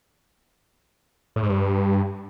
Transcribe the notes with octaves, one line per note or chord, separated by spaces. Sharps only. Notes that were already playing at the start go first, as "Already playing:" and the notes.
A2
G#2
G2